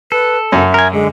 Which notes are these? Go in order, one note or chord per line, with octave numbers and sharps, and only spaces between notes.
A4 B4
F#2 E5
A#4 G#5
D3 G#3